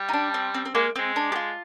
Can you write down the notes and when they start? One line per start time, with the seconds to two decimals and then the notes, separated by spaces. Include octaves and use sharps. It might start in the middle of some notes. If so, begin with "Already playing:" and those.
Already playing: G3
0.09 D#4
0.13 D4
0.34 C4
0.54 C4
0.65 C4
0.75 G#3 A#3
0.96 G#3 C4
1.16 D4
1.32 G4
1.35 F4